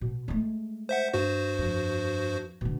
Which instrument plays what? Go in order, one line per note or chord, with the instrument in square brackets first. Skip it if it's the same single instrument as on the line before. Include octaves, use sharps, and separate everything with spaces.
[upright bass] B2
G#3 A3
[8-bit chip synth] C5 E5 F#5
G2 F#4 C5
[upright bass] F2
B2 D3